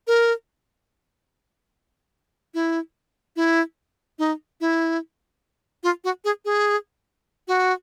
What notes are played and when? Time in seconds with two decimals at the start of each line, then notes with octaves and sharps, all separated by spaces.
0.07 A#4
2.54 E4
3.36 E4
4.19 D#4
4.61 E4
5.83 F4
6.04 F#4
6.25 G#4
6.45 G#4
7.48 F#4